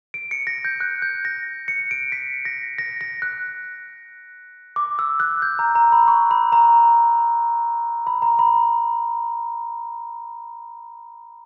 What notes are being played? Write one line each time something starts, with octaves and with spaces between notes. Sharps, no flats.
D7
C#7
A#6
G6
F#6
G6
A#6
C#7
D7
B6
A#6
A#6
A#6
F#6
D6
E6
F#6
G6
A#5
A#5
B5
C#6
B5
A#5
B5
A#5
B5